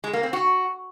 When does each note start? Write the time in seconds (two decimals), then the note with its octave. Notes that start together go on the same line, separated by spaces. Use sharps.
0.04 G#3
0.13 A#3
0.23 C4
0.33 F#4